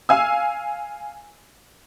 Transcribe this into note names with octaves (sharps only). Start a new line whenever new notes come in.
F5 G#5 E6